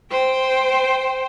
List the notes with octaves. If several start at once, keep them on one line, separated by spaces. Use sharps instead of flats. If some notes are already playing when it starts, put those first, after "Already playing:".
C5 G5